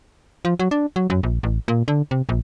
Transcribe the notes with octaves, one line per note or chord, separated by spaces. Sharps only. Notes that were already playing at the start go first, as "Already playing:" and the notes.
F3
F#3
D4
F#3
F#2
A#1
A1
A#2
D3
C3
A#1